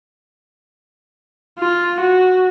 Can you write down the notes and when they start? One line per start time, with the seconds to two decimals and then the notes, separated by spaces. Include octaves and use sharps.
1.59 F4
2.00 F#4